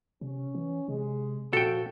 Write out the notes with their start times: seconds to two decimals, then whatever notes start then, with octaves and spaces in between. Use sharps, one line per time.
0.21 C3 C#4
0.55 E3
0.88 C3 G#3 G#4
1.53 F2 A#2 C#3 F3 F#4 A4 G5